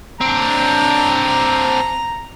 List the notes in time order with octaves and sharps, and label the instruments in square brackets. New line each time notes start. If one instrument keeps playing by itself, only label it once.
[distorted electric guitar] C4 D4 [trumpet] A#5